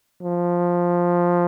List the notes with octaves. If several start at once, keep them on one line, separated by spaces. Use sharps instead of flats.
F3